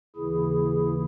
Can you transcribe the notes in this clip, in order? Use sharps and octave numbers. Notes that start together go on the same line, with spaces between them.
D#2 C#3 E3 E4 G#4